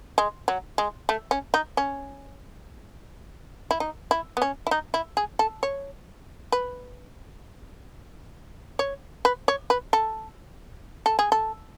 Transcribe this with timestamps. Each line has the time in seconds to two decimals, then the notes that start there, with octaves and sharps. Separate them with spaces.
0.18 G#3
0.48 F#3
0.78 G#3
1.09 A3
1.31 C#4
1.54 D#4
1.77 C#4
3.71 E4
3.80 D#4
4.11 E4
4.37 B3
4.42 C#4
4.67 E4
4.71 D#4
4.94 E4
5.17 G#4
5.39 A4
5.63 C#5
6.52 B4
8.79 C#5
9.25 B4
9.48 C#5
9.70 B4
9.93 A4
11.06 A4
11.19 G#4
11.32 A4